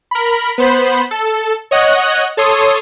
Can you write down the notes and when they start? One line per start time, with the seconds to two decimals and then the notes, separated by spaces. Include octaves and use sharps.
0.11 A#4 B5
0.58 B3 C5 B5
1.11 A4
1.71 C#5 D#5 F#5 F#6
2.37 A4 C#5 C6 D#6